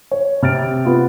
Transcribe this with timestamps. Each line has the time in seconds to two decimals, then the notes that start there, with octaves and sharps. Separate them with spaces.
0.11 C#5
0.42 C3 F6 A6 D7
0.85 B3 F4